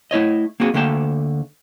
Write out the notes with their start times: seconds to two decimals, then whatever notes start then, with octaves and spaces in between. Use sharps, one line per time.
0.11 A3 E4 C#5 D#5
0.60 A#3 C4 F#4 G#4
0.74 D2 D3 A3 A#3 G5 A5